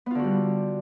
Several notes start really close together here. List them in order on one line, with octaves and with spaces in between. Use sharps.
B3 F4 D3 F#4 G3